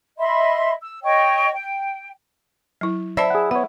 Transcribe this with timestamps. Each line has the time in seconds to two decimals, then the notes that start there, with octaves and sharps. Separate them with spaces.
0.18 D#5 E5 B5 C6
0.82 E6
1.03 C#5 D#5 G5 C#6
1.52 G5
2.81 F#3 E4
3.17 E4 C5 D5 E5 A5
3.30 G#4 F#5
3.51 B3 C#5 F#5